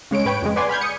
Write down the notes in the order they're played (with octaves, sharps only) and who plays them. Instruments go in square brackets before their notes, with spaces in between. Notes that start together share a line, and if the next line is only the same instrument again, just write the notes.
[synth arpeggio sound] C#3 G#3 C#5 D7
G#2 B4 C#5 G5 D7
F2 C#3 G#3
B4 D5 F#5 G#5 C6 D6
B5 F6 G6 G#6
D#6 C#7